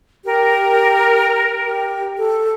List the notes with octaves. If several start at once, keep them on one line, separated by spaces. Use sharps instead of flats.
G4 A#4
G4
A4